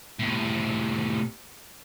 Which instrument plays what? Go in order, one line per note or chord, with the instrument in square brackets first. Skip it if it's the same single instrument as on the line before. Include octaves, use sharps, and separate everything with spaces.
[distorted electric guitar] A2 C3